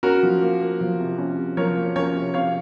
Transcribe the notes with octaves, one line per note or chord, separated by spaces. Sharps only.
C#4 F#4 A#4
F3
A#3
A#3
F3
C3
C#4
C3
F3 A#4 C#5
A#3
C#4 A#4 C#5
C3
C3 C#5 F5